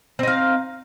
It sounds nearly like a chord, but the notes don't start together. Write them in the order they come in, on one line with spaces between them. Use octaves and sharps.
C4 D#4 F5